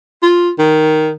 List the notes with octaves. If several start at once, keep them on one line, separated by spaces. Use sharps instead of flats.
F4
D#3